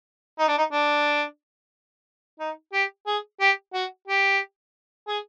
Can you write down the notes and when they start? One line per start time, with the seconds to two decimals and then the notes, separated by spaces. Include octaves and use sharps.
0.39 D#4
0.48 D4
0.58 D#4
0.72 D4
2.40 D#4
2.73 G4
3.07 G#4
3.40 G4
3.74 F#4
4.08 G4
5.08 G#4